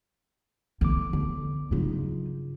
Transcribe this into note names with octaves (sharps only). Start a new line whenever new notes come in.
C2 D3 E3 B3 D6
D3
G2 C#3 F#3 D#4 F4